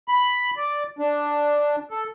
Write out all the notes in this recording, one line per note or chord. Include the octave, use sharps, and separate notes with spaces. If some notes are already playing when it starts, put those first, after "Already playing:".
B5
D5
D4
A4